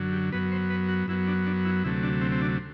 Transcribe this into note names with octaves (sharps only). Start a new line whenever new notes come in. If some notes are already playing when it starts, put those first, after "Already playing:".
Already playing: F#2 D3 F#3
G4
F#2 F#3 B3 B4
C5
B4
F#4
F#2 F#3 B3 E4
D4
D4
E4
D2 C3 F#3 A3 E4
D4
C4
C4
D4